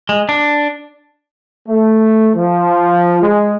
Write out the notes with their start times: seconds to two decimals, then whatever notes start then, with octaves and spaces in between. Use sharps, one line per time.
0.09 G#3
0.29 D4
1.68 A3
2.35 F3
3.22 G#3